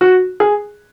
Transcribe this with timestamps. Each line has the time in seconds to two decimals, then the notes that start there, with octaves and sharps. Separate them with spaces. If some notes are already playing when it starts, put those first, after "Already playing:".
0.01 F#4
0.40 G#4